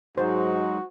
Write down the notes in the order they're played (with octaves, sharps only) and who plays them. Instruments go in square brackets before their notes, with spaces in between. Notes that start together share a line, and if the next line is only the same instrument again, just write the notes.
[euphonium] G#2 [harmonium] F#3 G#3 D#4 [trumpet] F#4 [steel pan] C5